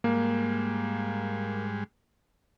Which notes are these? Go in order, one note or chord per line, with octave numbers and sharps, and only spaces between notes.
G#2 G3 G#3 A#3